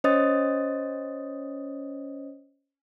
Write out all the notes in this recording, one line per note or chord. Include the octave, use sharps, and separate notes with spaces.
C#4 C5 C#5 D#5 D#6 A6